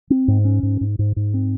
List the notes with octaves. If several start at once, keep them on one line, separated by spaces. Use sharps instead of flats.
C4
G#2
C#4
G#2
G#2
G#2
G#2
C4